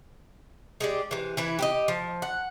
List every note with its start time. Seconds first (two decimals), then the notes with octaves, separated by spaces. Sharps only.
0.80 G#3 G4 D5
1.11 C3 E3
1.37 E3 E4 B4
1.59 G4 B4 D#5
1.88 F3
2.22 F#5